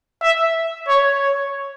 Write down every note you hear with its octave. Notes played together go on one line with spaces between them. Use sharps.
E5
C#5
C#5